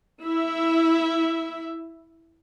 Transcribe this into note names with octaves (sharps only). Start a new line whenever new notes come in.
E4 E5